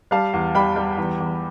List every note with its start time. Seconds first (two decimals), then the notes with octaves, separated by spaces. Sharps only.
0.11 G3 F5 A5
0.33 E2
0.55 G3 G5 B5
0.76 G3
0.97 E2
1.20 E2